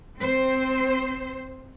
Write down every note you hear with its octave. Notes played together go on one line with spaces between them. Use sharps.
C4 C5